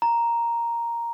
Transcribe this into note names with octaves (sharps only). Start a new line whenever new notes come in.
A#5